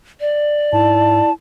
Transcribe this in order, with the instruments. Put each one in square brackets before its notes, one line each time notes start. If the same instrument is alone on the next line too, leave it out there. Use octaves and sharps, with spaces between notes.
[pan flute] D5
[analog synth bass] G#2 [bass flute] E4 [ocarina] A5